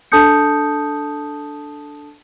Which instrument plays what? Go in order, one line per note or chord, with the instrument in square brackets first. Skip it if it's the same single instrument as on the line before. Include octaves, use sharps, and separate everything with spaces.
[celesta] D4 A4 A5 D#6 G6 C#7